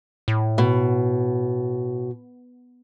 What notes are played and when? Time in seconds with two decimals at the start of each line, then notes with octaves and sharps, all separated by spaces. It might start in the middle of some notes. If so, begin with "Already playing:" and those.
0.28 A2
0.58 B2